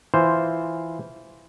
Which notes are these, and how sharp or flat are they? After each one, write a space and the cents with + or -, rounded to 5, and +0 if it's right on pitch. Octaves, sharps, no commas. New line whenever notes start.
E3 +0 F4 +0 C5 +0